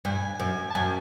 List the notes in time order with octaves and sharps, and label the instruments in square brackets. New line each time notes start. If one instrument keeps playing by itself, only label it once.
[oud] G2 [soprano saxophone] G#5
[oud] F#2
[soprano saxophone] A5
[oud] F#2 [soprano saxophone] G#5